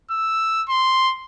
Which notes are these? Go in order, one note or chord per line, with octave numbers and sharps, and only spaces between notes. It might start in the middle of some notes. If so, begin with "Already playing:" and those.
E6
C6